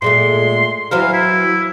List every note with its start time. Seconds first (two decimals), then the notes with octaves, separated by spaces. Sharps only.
0.02 A#2 G#3 A3 C6
0.91 E3 F#3 C5 F5
1.13 E4